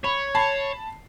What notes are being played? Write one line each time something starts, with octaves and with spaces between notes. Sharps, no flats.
C#5 B5
A5 B5 C7